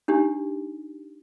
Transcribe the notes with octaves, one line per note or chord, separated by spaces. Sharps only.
D4 D#4 G4